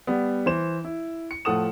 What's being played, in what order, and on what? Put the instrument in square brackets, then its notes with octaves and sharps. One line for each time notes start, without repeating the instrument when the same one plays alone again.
[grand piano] G3 B3
E3 C5 E7
E4
C#7
A2 F3 A4 F#5 D#6 E7